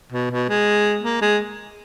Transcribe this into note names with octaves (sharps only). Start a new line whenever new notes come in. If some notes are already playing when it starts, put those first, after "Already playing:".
B2
B2
G#3
A#3
G#3